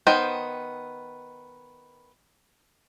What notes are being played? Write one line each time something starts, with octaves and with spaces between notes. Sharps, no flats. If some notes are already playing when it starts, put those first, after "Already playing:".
D#3 B3 D#4 C5 G5